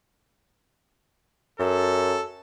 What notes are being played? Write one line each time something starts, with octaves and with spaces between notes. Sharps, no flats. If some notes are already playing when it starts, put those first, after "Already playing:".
F#2 A4